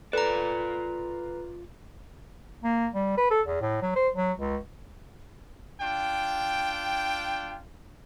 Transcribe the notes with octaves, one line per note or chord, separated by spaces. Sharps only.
F4 A4 B4 D5 A#5
A#3
G3
B4
A4
E2
A2
F#3
C5
F#3
C#2
D4 F4 G5